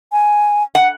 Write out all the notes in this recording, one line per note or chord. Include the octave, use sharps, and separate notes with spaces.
G#5
F#5